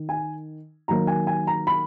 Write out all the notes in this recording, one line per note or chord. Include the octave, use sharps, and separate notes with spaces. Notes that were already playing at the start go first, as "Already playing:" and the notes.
Already playing: D#3
G#5
D#3 F#3 A#3 A#5
G#5
G#5
A#5
B5